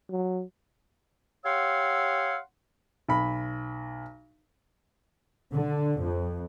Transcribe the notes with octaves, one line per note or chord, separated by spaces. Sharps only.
F#3
G4 C#5 F5 F#5 C6 E6
B1 B5
D3
F2